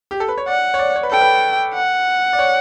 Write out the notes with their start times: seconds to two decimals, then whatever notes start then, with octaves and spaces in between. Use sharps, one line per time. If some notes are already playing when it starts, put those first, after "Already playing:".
0.11 G4
0.20 A4
0.29 B4
0.38 C#5
0.48 D5 F#5
0.74 C#5
0.79 D5
0.96 C#5
1.03 B4
1.11 A4 G5
1.21 B4
1.75 F#5
2.33 D5
2.39 C#5